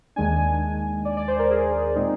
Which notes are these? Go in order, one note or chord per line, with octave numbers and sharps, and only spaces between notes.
D#2 D#3 G#3 D4 G#5
D5
D5
C5
A#4
G#4
A#2 G#3 C4 D#4